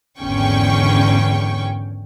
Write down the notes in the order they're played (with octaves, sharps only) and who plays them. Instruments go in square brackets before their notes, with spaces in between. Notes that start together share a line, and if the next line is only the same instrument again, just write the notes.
[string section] G#1 E2 D3 C#4 G5 C#6